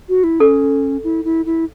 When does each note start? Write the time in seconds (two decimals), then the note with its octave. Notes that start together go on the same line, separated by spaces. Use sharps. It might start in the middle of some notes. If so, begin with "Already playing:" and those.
0.09 F#4
0.24 E4
0.40 C#4 A4
1.04 E4
1.25 E4
1.46 E4